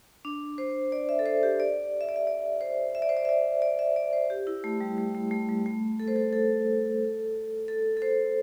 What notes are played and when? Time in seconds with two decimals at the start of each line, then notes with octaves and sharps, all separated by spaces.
0.25 D4
0.58 C5
0.92 D5
1.09 E5
1.19 A4
1.26 C5
1.43 G4
1.60 D5
2.01 E5
2.09 D5
2.16 E5
2.27 D5
2.61 C5
2.95 E5
3.02 D5
3.09 C5
3.17 D5
3.25 E5
3.29 D5
3.62 D5
3.79 E5
3.96 D5
4.13 C5
4.30 G4
4.47 E4
4.64 A3
4.80 G3
4.98 A3
5.15 A3
5.31 A3
5.49 G3
5.66 A3
6.00 A4
6.08 C5
6.16 A4
6.33 A4
7.68 A4
7.97 A4
8.02 C5